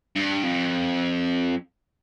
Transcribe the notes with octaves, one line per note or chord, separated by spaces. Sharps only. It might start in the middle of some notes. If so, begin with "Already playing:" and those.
G2
F2